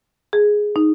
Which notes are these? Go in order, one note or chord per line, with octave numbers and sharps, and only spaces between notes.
G#4
D#4